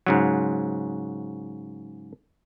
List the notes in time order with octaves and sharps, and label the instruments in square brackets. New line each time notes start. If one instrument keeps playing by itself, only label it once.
[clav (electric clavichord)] G#2 C#3 F#3